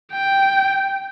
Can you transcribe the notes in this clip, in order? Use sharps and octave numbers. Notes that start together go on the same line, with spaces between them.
G5